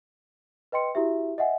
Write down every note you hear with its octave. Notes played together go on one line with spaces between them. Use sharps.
B4 D#5 G5 C6 C#7
E4 F#4 G4 E5
D#5 E5 F#5 G#5